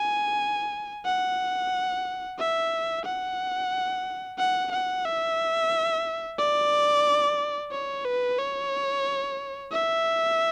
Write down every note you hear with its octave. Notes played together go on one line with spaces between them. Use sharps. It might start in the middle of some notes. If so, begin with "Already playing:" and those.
Already playing: G#5
F#5
E5
F#5
F#5
F#5
E5
D5
C#5
B4
C#5
E5